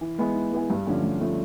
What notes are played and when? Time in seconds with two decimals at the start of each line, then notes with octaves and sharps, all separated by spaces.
0.01 E3
0.19 G#3 B3 E4 G#4
0.35 E3
0.52 G#3 B3 E4 G#4
0.70 G2
0.86 D3 F3 A3 C#4
1.03 G2
1.21 D3 F3 A3 C#4